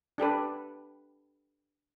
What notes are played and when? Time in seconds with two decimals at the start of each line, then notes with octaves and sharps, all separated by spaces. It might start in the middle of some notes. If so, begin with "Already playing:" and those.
0.18 D4 G4 A4 B4